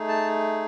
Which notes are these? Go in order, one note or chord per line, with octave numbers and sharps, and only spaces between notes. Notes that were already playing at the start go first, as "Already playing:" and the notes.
Already playing: A3 D#4 G#4
A5